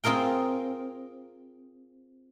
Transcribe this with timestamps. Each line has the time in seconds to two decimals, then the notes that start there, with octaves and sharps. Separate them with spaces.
0.04 C4 F4 G#4 A#4 G5